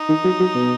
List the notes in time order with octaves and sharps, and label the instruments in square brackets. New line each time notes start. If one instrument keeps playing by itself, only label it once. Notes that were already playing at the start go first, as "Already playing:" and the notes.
Already playing: [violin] D#4
[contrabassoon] D#3
F#3
F#3
B2